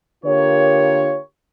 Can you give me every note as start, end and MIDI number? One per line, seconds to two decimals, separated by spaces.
0.24 1.17 50
0.24 1.17 58
0.24 1.17 65
0.24 1.17 67
0.24 1.17 70
0.24 1.17 73